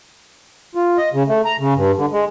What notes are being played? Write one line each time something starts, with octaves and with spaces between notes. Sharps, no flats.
F4
D#5
C#3
A3
A#5
C#3
G2
D3
G#3